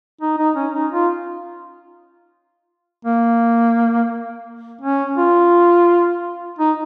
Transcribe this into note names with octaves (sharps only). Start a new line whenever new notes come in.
D#4
D#4
C#4
D#4
F4
A#3
C#4
F4
D#4